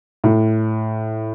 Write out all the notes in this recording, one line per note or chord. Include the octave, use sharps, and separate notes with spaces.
A2